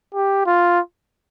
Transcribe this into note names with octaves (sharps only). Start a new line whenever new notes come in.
G4
F4